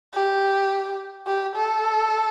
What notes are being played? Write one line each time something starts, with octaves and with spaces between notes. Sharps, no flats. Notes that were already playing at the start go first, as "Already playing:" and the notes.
G4
G4
A4